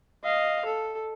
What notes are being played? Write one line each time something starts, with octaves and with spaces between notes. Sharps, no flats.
D#5 F5
A4